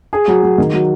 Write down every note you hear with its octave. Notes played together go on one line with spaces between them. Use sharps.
G#4
F#3
F#3
D#3
F#3